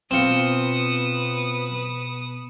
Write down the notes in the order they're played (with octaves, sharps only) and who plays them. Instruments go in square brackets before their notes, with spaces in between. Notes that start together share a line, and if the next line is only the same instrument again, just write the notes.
[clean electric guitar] B2 [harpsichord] C4 F4 [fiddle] B4 D#6 [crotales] C#7 E7